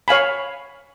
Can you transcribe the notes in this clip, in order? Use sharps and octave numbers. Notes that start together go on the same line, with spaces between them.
C#5 F5 G#5 B5